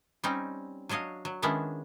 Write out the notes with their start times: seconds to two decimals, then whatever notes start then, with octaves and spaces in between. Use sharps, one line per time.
0.24 G3 C4 C#4 D#4
0.89 F#3 D4 C#5 D#5 F5
1.25 F#3
1.42 D#3 G#3 B3 C#4 D4 E4